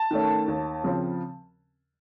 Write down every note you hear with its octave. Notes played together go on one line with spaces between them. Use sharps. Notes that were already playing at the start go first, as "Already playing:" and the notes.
Already playing: A5
D#3 A3 C#4
D#2
C#3 F3 C4